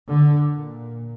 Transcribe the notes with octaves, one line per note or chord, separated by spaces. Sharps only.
D3
A#2